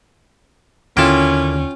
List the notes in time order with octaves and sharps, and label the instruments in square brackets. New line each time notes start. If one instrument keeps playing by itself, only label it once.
[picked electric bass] D#2 D3 [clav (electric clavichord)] A#3 E4 A4 [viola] C#4 [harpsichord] F4 G5